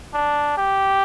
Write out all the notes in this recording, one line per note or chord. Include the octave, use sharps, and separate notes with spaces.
D4
G4